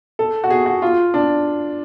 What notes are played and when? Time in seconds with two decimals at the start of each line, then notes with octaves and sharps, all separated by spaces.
0.19 A4
0.44 F#4
0.51 G#4
0.66 F#4
0.82 F4
1.14 D4